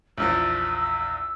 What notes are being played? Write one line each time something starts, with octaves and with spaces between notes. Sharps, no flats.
A#1 E2 F3 E6